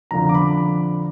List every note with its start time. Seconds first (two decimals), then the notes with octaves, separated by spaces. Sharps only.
0.11 F2 D3 F3 A#5
0.29 D6
0.34 B5